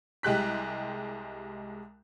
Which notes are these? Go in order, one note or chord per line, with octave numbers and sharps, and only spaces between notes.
C2 G#3 G4 F#6 B6